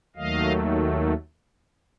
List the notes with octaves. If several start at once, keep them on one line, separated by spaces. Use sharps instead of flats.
D#2 D#3 F#3 A3 D#5 F5